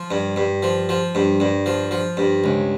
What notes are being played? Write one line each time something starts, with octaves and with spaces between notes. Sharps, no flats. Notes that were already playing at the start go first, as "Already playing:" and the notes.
Already playing: F3
G2
G2
F3
F3
G2
G2
F3
F3
G2
C#2